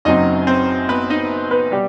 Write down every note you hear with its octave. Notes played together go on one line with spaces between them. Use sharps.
F#1 F#2 F#3 C4 D#4 D#5
C4 C5
B3 B4
D#4 D#5
B3 B4
B2 G3 G4